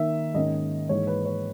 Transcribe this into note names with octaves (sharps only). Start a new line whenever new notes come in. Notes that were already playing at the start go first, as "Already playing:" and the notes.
Already playing: D#3 A#3 D#4 E5
G#2 D#3 A#3 C#4 D#5
G#2 E3 A#3 D#4 C#5
B4
C#5